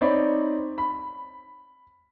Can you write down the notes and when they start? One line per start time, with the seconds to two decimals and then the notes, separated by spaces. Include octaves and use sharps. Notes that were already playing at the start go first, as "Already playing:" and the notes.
0.01 C4 D#4 C#5 D5 B5
0.78 B5